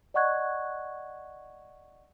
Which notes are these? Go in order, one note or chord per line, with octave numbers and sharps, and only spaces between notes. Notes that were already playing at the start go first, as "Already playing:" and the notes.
D5 D#5 F#5 C#6 F#6 G#6